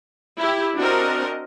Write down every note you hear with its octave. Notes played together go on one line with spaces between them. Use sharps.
E4 G4
C4 D4 F#4 A#4 D#5